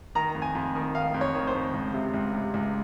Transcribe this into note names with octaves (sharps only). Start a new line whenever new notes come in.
D#3 A#5
F2
G#5
F2
D#3
D#3 F5
F2
C#5
D#3
C5
F2
C#2
C3
C#2
C3
C#2